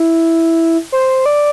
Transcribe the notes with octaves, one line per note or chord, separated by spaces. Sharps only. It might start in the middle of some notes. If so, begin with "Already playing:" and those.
Already playing: E4
C5
D5